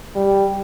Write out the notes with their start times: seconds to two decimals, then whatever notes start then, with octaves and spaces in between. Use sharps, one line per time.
0.16 G3